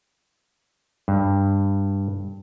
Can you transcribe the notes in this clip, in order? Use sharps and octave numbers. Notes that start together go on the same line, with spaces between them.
G2